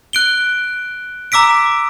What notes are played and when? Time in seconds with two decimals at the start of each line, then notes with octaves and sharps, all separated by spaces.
0.13 F#6 D7 G7
1.32 A#5 D6 E6 B6 D7